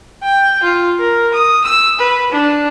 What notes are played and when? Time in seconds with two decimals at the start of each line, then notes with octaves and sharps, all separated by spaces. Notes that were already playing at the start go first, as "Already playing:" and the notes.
0.23 G5
0.63 F4
0.99 A#4
1.34 D#6
1.64 E6
1.99 B4
2.32 D4